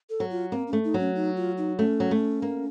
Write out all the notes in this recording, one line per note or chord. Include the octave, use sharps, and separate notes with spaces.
A4
F#3
F4
A#3 C4
C#4
A3
D#4
F#3
C#4
D#4
F4
D#4
A3 C#4
F#3
A3
A#3